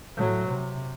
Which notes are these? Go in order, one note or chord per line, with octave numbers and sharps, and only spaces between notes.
A2 F#3
C3